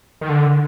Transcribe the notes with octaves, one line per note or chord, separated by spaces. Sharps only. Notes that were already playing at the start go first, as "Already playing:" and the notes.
D#3
D3